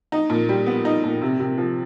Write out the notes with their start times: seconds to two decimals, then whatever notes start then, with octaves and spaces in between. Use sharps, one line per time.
0.12 D#4
0.30 A#2
0.49 G3
0.66 B3
0.85 D#4
1.04 A#2
1.22 C3
1.40 C3
1.58 F3